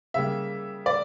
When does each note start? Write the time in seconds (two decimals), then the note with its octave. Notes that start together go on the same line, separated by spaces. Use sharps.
0.14 C#3 G3 A#3 E5
0.86 D5